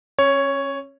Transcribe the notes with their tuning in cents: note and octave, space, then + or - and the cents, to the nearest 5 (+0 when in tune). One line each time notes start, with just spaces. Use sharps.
C#4 -30 C#5 +0